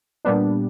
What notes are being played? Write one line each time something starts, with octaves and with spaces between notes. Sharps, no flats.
A#2 G3 B3 D4